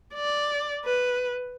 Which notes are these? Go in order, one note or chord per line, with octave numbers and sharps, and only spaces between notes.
D5
B4